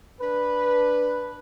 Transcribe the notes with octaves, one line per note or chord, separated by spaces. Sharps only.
D4 B4